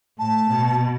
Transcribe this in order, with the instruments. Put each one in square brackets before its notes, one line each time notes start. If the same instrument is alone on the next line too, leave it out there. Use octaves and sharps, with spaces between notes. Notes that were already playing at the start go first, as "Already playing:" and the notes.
[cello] A2 [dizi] A5
[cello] B2